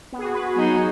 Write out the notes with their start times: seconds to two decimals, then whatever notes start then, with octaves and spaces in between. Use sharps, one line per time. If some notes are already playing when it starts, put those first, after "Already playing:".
0.12 B3
0.19 G#4
0.23 F#4
0.34 B4
0.44 G#4
0.55 F#3 B3 D#4 F#4 G#4